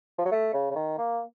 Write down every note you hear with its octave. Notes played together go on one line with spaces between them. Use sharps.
F3
F#3
A3
C#3
C#3
D#3
A#3